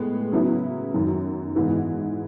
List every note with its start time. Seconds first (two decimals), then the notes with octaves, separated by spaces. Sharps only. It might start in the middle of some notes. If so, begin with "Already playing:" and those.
Already playing: A2 G#3 B3
0.32 C#3 F#3 B3 E4
0.94 F#2 D#3 F#3
1.55 G#2 E3 B3